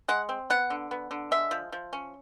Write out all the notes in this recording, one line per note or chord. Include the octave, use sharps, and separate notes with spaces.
G#3 F#5
C4
B3 F#5
D3
B3
D3
G#3 E5
F3
F3
C#4